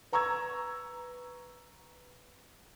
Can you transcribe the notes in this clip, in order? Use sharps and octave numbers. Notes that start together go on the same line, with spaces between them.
B4 A#5 C#6 E6 G#6